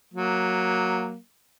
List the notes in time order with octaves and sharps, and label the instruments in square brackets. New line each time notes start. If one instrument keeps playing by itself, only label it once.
[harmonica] F#3 A#3